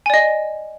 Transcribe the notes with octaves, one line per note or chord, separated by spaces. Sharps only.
D5 D#5 G#5